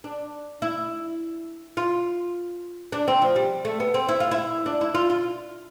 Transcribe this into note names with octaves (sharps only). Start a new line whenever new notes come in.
D4
E4
F4
D4
C4
F3
G3
A3
B3
C4
E4
F4
E4
D4
E4
F4
F4